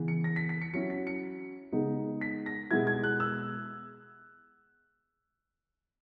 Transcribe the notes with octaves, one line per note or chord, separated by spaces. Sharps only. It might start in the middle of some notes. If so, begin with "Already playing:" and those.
Already playing: C#3 E3 B3
C#7
A#6
B6
B6
C#7
F#3 C#4 E4 C#7
B6
C#7
C#3 G#3 B3 D#4
B6
A#6
B2 G#3 B3 E4 G#6
G#6
F#6
E6